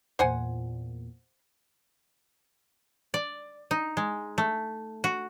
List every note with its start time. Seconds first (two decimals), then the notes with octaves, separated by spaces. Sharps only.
0.19 E2 A#2 C5 F#5 G#5
3.14 D5
3.71 D#4
3.97 G#3
4.38 A3
5.04 F#4